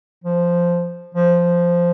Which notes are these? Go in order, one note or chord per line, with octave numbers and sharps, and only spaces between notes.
F3
F3